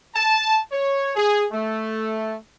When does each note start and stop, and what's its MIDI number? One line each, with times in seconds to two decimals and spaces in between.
0.15 0.58 81
0.72 1.11 73
1.16 1.45 68
1.52 2.35 57